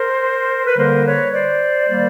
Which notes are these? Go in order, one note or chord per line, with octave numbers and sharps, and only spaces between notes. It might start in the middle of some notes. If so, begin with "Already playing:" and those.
Already playing: A#4 C5
B4
D3 G3 A#3 A#4 C5
B4 C#5
C5 D5
D#3 G3 A#3